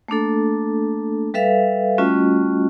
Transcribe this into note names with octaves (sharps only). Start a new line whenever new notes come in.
A3 A#3 D4 A4
G3 A4 B4 E5 F5
G3 A3 C#4 F4 F#4 D#5